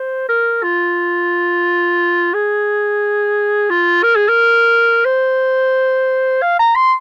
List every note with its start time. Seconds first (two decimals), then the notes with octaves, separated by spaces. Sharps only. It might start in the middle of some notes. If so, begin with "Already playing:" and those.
Already playing: C5
0.29 A#4
0.63 F4
2.34 G#4
3.70 F4
4.03 A#4
4.16 G#4
4.28 A#4
5.05 C5
6.42 F5
6.59 A#5
6.75 C6